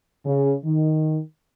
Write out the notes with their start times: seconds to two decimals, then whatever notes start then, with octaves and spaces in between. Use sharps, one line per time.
0.25 C#3
0.65 D#3